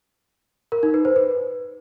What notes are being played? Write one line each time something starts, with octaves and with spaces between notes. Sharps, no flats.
A#4
D#4
B4
C5
B4